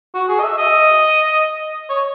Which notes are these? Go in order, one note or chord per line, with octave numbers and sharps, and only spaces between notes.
F#4
G#4
D#5
E5
D#5
C#5